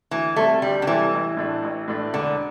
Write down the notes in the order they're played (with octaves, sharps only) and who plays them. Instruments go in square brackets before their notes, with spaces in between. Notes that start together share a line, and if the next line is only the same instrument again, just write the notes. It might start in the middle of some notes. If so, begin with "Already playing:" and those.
[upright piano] D2 [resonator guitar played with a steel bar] E3
[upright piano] C3 G3 C4 A4 [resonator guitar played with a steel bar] A3
[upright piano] D2 [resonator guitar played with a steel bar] G3
[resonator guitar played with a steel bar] D3
[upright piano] C3 G3 C4 A4 [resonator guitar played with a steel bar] E3
[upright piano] A1
A2 A3 D4
A1
A2 A3 D4
[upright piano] E1 [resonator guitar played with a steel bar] D3